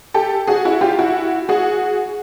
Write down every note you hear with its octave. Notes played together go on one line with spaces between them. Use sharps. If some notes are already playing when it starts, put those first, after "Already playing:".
G4 A4
F#4 G#4
E4 F#4
F4 G4
E4 F#4
F#4 G#4